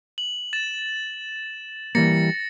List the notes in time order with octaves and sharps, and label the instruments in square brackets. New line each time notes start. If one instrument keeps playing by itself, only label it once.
[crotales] F#7
A6 E7
[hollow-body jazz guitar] E3 G3 A#3 [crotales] A6 A#6 C#7